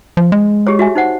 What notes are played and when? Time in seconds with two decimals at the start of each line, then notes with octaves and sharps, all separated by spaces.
0.17 F3
0.32 G#3
0.67 G4 G#4 C#5
0.79 F#4 E5 G#5
0.95 D#4 C5 F#5